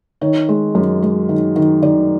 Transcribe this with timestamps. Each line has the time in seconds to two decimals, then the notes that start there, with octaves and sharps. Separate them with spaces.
0.21 D#3 C#5
0.49 G#3
0.75 F#2
1.02 G#3
1.29 D#3
1.56 D#3
1.83 D#3 D5